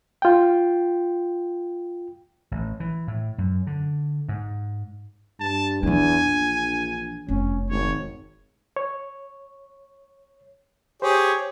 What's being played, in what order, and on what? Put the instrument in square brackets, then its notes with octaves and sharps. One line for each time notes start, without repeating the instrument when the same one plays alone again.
[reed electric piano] F4 G5
[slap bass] A1
E3
A2
F#2
D3
G#2
[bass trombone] G2 [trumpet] A5
[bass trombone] E2 [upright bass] E3 D4 [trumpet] G#5
[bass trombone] A#1
[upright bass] F1 [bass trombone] C#4
[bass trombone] G#1 [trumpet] C#5
[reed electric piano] C#5
[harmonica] G4 G#4 C#5 [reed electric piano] C5